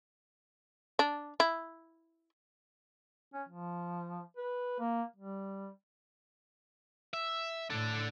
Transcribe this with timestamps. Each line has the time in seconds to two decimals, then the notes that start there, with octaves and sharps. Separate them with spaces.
0.99 D4
1.40 E4
3.33 C#4
3.48 F3
4.37 B4
4.79 A#3
5.16 G3
7.13 E5
7.70 A2 D4 A4